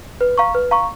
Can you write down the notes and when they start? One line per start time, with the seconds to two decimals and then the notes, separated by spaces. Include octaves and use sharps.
0.21 B4
0.38 F5 A#5 C#6
0.55 B4
0.71 F5 A#5 C#6